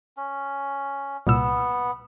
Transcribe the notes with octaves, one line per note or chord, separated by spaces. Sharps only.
C#4
C2 A#2 B3 E6